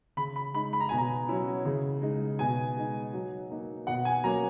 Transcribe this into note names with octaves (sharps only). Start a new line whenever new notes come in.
C#3 B5
B5
G#3 D#4 B5
B5
A#5
B2 G#5
A#5
F#3 C#4 E4
C#3
G#3 D#4
B2 G#5
G#3 D#4
F#3
A#3 D#4
B2 F#5
G#5
F#3 A#3 C#4 A#5